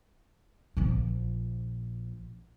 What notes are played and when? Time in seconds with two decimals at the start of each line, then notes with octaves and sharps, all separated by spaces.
0.77 A#1 F3